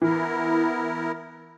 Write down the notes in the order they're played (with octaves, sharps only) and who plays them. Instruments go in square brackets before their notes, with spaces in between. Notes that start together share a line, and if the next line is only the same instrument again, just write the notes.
[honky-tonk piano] E3 [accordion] B3 E4 A#4